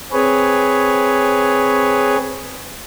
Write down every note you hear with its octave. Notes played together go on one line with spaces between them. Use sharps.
C4 G#4 B4 C#5